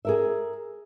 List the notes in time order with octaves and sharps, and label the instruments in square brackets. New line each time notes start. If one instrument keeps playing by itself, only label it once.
[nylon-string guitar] G#4 A#4 E5